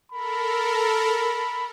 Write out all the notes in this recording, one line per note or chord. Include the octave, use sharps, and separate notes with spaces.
A4 A#4 B5